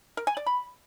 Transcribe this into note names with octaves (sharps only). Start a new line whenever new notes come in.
A#4
G#5
D5
B5